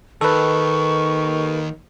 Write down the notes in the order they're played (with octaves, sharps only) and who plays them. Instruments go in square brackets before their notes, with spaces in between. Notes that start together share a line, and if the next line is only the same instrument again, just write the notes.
[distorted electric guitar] D#2 [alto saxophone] D#3 [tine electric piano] A4 B4 [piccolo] C#6